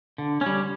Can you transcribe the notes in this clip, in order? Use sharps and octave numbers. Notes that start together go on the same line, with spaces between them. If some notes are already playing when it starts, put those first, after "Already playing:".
D3
G3 C#4